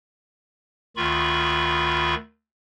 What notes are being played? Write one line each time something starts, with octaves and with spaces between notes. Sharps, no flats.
D2 D#3 F4 B5 C#6